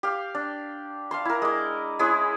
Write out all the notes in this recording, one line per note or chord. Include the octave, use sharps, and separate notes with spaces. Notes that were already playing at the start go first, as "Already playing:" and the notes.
G4 F5
D4
F5 A5 C6
E4 A#4
G#3 D6
G#3 C#4 E4 G#4